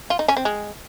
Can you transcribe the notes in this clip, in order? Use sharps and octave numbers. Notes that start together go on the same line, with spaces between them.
F4
D#4
C#4
C4
G#3